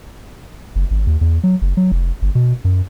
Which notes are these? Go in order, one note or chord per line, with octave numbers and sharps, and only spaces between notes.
F#1
G#1
D#2
E2
F#3
F#1
F#3
F1
G1
B2
F#2